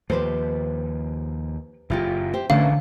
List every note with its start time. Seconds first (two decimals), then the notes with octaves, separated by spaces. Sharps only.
0.10 D#2 F3 G4 B4 C5
1.90 F#1 F#2 A#2 E4 F4 G4
2.34 G4 C5
2.50 A1 A#2 D3 E3 A3 C#4 F5